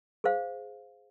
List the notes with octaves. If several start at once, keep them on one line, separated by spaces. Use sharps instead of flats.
G#4 C5 F5